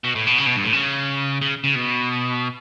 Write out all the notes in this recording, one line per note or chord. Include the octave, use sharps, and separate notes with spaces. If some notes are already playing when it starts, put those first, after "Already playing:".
B2
A2
B2
C#3
B2
G2
A2
C#3
C#3
C#3
B2